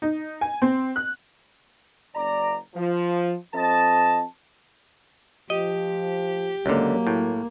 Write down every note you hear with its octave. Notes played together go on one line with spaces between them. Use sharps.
D#4
G#5
C4
F#6
F#1 D5 A#5
F3
F3 C4 A4 D#5 A5
F3 G4 D#5
C#2 D3 F#3 A#3
A2